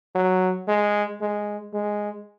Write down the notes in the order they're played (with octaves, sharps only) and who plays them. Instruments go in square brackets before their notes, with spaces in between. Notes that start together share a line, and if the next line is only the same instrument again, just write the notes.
[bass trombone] F#3
G#3
G#3
G#3